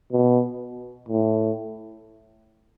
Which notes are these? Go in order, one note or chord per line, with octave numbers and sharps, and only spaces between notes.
B2
A2